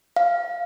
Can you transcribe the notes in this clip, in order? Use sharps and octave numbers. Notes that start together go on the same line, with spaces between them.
F5